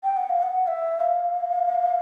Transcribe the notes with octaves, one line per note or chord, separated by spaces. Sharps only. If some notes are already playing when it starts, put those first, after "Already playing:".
G5
F#5
F5
F#5
E5
F5